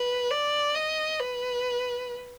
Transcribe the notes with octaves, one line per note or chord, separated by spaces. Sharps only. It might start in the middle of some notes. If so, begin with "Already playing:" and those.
Already playing: B4
D5
D#5
B4